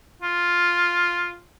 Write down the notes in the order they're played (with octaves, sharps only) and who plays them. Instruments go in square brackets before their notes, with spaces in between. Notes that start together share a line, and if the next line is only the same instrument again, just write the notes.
[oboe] F4